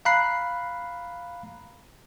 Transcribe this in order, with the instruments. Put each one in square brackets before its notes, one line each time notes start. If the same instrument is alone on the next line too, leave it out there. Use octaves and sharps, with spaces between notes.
[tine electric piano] F5 A#5 B5 F#6 C7